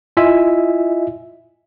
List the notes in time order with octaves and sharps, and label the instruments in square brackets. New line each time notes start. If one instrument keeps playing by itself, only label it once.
[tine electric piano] E4 F4 D#5 E5 G#5